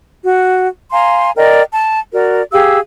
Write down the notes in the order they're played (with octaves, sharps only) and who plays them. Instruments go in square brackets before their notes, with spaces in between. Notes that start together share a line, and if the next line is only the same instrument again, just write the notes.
[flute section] F#4
F5 G#5 A#5 C6
A#4 D5 D#5 G5
A5
F#4 A#4 D5
G4 G#4 F5 E6